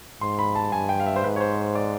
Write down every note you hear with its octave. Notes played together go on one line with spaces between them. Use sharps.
G#2 C6
B5
A5
G2 G#5
G5
F5
E5
C5
G#2 B4
C#5
C5
D5